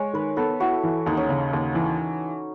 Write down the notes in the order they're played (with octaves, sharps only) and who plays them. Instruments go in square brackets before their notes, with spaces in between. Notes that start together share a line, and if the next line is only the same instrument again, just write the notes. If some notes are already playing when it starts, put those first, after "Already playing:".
Already playing: [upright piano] G#3 [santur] C#5
[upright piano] D#3 [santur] B4
[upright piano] B3 [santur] A4
[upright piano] E4 [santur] F#4
[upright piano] E3
[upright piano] D#2 [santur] D#4
[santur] C#4
[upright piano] C#3
D#2
E3